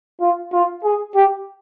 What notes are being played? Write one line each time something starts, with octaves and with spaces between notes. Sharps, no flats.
F4
F4
G#4
G4